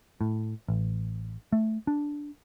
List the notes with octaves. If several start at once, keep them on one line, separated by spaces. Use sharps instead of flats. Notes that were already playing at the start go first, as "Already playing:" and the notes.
A2
A1
A3
D4